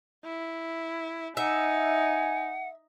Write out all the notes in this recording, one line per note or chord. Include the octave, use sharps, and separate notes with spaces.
E4
D#4 E5 F#5 G#5